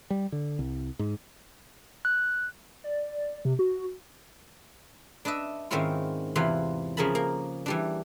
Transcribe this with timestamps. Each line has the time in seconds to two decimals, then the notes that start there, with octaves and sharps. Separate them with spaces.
0.10 G3
0.32 D3
0.59 C2
0.99 G#2
2.05 F#6
2.84 D5
3.45 C3
3.59 F#4
5.25 D4 B4 D#5 E5
5.71 G#2 D#3 C4 C#4 E4 F4
6.35 E2 C3 E3 F4 B5 C6
6.97 C#3 F3 G#4 A#4 A5 B5
7.15 A#3
7.66 E3 G3 D4